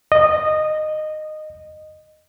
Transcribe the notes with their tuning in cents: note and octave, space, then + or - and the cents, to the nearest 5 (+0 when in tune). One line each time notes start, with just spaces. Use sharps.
D#5 -15